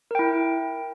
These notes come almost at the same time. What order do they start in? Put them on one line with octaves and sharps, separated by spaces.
A#4 G5 E4